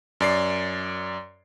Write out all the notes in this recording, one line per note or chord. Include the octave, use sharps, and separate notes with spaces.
F#2 D5 C7